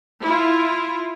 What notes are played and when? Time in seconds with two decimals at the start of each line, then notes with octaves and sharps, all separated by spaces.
0.21 E4 F4